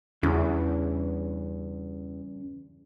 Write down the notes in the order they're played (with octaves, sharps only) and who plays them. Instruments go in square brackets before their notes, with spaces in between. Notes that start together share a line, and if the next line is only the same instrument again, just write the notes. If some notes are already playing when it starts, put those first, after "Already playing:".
[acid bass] E2 [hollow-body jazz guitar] G2 C#3 E3